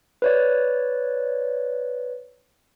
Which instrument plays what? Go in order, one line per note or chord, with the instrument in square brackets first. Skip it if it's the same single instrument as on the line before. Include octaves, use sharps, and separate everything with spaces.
[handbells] B4 C#5 D5